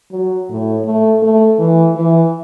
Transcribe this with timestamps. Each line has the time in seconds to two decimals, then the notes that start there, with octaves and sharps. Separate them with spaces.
0.12 F#3
0.49 A2
0.86 A3
1.23 A3
1.59 E3
1.96 E3